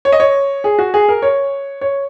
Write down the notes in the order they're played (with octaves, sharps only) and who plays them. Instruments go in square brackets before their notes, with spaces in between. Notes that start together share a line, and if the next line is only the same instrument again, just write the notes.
[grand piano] C#5
D#5
C#5
G#4
F#4
G#4
A#4
C#5
C#5